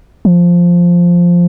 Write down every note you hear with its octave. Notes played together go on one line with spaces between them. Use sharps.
F3